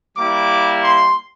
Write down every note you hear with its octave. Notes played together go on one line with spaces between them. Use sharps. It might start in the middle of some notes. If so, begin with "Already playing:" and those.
G3 A#3 E4 D6
C6